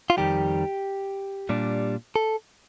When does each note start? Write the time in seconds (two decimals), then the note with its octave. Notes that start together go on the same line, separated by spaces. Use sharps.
0.10 F4
0.17 F2 D#3 G3 G4
1.49 A#2 G3 D4
2.16 A4